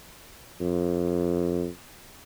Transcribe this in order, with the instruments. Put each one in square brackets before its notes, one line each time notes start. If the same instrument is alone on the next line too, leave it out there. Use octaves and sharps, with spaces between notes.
[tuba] F2